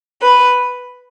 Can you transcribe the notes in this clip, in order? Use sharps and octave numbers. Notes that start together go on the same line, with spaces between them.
B4